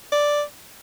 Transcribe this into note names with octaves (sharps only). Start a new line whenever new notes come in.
D5